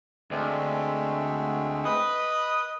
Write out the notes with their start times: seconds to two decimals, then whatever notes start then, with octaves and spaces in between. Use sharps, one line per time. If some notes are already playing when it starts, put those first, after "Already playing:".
0.31 D2 G#3 A3 C4
1.86 B4 D#5